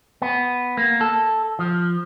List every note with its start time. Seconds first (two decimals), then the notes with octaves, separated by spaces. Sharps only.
0.22 B3
0.77 A#3
1.01 A4
1.59 F3